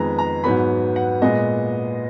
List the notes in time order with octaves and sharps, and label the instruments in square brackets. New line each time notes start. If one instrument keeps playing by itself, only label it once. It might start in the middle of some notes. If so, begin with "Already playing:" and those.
Already playing: [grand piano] F2 D#3 G#3 B3 A#5
A#5
G#2 F#3 B3 B5
F#5
A#2 G#3 B3 D#5